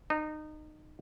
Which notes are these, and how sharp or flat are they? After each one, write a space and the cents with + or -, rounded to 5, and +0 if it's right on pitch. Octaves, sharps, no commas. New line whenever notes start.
D#4 -25